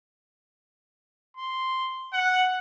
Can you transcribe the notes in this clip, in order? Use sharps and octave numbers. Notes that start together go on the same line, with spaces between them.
C6
F#5